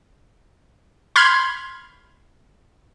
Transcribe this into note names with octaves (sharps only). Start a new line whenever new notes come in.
B5 C6 F6 G6 G#6